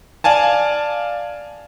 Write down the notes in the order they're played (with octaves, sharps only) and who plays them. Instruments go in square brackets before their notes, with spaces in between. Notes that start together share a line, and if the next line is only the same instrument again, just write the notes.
[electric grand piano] D5 F5 G#5 A5